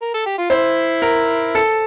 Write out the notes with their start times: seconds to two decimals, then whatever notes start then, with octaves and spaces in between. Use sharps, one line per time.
0.02 A#4
0.14 A4
0.26 G4
0.38 F4
0.50 E4 C5
1.02 A#4
1.55 A4